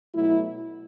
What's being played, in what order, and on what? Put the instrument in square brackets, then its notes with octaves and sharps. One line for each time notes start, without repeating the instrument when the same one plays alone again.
[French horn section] B2 F#3 A3 E4